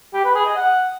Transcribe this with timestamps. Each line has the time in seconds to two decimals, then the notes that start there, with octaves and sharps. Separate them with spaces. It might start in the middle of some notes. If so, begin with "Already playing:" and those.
0.14 G4
0.24 B4
0.35 G#4
0.46 D#5
0.56 F#5